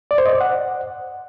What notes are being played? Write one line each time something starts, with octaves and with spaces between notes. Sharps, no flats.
D5
C5
D#5
D5
F#5